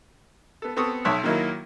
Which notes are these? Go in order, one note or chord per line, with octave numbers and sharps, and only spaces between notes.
B3 A4
B3 C4 A4 C#6 D#6
B1 C#5 E5 A5 D#6 F#6
D#3 F#3 A#3 D#4 E4